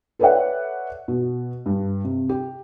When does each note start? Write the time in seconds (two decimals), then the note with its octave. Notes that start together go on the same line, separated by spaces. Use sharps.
0.19 A4 B4 C#5 D5 E5 F#5
1.08 B2
1.66 G2
2.04 C3
2.29 G4